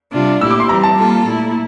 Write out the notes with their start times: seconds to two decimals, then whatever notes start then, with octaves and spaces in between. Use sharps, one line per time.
0.13 C3 G3 D4 F4
0.41 A#2 A3 E4 G4 E6
0.51 D6
0.60 C6
0.69 E3 G3 C4 A#5
0.83 A5
0.97 G3 A#3 F4 A4
1.25 A#2 A3 E4